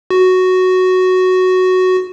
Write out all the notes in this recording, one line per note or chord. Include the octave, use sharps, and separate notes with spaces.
F#4